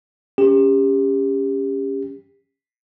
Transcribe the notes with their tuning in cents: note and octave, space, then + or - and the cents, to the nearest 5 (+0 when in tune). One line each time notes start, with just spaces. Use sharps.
C#4 +0 G4 +30